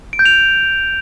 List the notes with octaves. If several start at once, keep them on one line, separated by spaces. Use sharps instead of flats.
D7
G6
F7